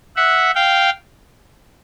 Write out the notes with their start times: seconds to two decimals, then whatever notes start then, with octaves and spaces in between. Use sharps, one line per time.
0.16 E5 F#5
0.55 F5 G5